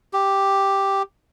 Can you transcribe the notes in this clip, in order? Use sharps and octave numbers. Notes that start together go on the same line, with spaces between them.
G4